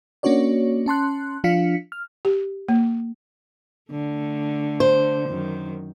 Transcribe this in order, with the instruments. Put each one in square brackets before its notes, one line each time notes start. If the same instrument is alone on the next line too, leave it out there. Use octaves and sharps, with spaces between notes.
[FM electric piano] A#3 C#4 D4 F#4 C#5 D5
C#4 A5 C6 F#6
F3 D4 F4 F5 B6 C#7
F6
[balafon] G4
A#3
[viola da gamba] D3 A3
[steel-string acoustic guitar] C5
[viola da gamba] F#2 D#3